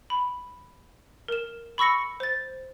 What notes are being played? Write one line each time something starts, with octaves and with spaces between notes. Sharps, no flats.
B5
A#4 E7
B5 C#6 E6 A#6 C#7
C5 A6